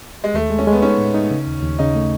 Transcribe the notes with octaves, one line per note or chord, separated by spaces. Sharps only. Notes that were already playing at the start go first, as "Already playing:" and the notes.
G#3
D#2 A3
G#3
C#4
G#3
B3
C#4 D#4
A2
D#4
C#3
D#2
D#2
C#3 D#4
A3